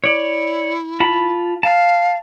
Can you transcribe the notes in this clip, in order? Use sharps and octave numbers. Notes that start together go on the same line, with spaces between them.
E4 C#5 D5
F4 A5 B5
F5 A5 F6